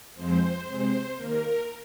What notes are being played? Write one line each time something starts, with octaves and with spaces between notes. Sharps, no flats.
F2 F3 G#3 C4 C5
C3 G#3 C4 C5
D#2 D#3 A#3 A#4